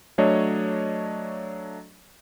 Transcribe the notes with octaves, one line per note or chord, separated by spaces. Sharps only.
F#3 A3 D4 C#5 D#5